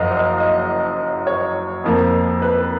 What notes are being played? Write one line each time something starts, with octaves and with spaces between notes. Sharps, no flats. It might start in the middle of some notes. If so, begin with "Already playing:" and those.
Already playing: F#1 F#2 F3 D#5 F5
D#5
D#5
C#5
F2 F3 A#3
B4